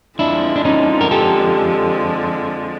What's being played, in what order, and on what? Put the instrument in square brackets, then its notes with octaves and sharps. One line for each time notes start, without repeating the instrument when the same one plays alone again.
[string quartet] F2 D3 F3 G#3 [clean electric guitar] D4 E4
[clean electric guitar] D4
C#4 D#4
A#4
G4 A4